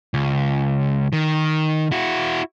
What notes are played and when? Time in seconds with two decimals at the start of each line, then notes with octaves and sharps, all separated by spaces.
0.14 C#2
1.13 D#3
1.92 E4 F#4